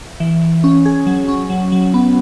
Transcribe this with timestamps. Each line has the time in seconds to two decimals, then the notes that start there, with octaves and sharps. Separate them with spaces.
0.20 E3
0.41 E3
0.64 C#4
0.85 G#4
1.06 F#3
1.28 C#4
1.50 F#3
1.72 F#3
1.94 B3